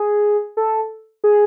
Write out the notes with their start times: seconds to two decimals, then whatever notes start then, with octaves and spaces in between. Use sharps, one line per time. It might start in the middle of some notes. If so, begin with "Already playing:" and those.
Already playing: G#4
0.57 A4
1.24 G#4